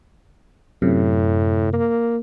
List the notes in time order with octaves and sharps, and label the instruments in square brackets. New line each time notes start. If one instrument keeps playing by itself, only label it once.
[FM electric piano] F#2 C3 [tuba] A2
[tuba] A#3